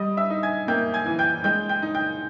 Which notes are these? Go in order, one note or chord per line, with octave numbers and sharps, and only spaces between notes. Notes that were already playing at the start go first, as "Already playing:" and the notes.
Already playing: G3 D#5 D#6
E5 E6
D#4
G#5 G#6
A#3 G5 G6
G#5 G#6
E3
G5 G6
G#3 G5 G6
G5 G6
D#4
G5 G6